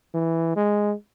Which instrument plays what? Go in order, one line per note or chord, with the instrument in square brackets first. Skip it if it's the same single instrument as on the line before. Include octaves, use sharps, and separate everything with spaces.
[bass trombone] E3
G#3